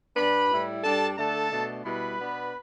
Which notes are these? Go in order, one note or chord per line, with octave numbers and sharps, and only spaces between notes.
G2 G3 D4 B4 B5
A2 G3 E4
G2 G3 D4 A4 A5
D3 A3 D4 A4 A5
B2 A3 D4
B2 G3 E4 B4 B5
B2 B3 D4